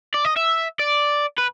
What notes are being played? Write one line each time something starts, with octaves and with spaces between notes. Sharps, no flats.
D5
D#5
E5
D5
B4